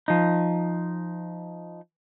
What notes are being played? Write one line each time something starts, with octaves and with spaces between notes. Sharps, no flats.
F3 D#4